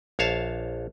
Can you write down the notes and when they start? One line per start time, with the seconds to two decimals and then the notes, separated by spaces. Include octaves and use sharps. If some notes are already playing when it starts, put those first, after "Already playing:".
0.19 A#1 C#5 F5 A5